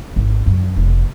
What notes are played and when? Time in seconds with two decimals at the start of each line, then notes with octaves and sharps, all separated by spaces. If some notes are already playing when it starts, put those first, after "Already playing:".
0.16 G#1
0.46 F#2
0.77 F1